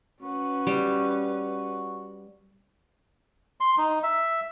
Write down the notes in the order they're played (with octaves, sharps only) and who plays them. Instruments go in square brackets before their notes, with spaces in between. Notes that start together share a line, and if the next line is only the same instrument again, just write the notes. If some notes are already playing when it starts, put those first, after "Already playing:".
[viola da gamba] C#4 B4 [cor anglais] F#4
[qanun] G3
[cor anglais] F#4
[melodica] C6
D#4
E5